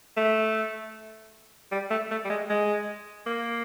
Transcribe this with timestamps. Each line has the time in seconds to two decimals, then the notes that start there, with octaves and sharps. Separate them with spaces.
0.17 A3
1.72 G3
1.91 A3
2.11 A3
2.25 G3
2.30 G#3
2.50 G#3
3.26 A#3